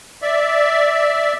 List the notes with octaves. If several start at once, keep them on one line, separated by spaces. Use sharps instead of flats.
D5 E5